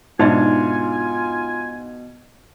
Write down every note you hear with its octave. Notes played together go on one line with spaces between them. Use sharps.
G#2 B2 D4 D#4 F4 D#5 E5 G#5